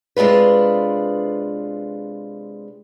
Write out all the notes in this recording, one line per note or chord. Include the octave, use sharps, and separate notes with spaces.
C3 G#3 D4 F4 B4